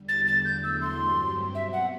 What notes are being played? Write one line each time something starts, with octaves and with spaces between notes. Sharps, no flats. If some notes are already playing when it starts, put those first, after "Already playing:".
Already playing: E2 D3 G3
A6
A6
E2 D3 F#3 A3 E4 G6
E6
C6
G2 F#3 C4 G4
B2 F#3 C4 E5
F#5